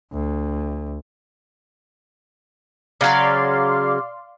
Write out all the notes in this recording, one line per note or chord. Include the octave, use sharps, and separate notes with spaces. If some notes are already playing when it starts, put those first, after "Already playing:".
D2
C#3 F#3 D5 F5 C6